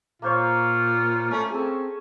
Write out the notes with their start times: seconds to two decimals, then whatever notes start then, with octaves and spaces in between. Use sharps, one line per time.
0.22 A#2 A#3 F4 C5 C#5
1.31 A3 C#4
1.51 C4 G#4 A4